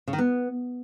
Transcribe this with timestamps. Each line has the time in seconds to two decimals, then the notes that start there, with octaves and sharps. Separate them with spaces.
0.08 C#3
0.13 D#3
0.18 B3